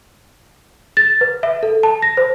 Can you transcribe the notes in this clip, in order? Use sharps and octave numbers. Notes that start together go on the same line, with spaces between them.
A6
B4
E5
A4
A5
A#6
C5